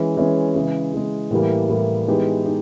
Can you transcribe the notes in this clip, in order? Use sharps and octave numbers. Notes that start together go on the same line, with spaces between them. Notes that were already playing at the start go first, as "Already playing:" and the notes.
Already playing: E3 G#3 C#4
E3 G#3 C#4
C#3 E3 G#3
C#3 E3 G#3
A2 E3 G3 A#3
A2 E3 G3 A#3
E3 G#3 B3 D#4 G4
D#4 G4